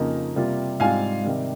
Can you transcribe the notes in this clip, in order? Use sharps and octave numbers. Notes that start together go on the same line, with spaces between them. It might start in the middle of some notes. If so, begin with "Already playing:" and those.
Already playing: F2 C#3 F3 A#3 D#4
C3 G3 A#3 F4
G#2 G3 C4 F4 F5 G#5
C3 D#3 G3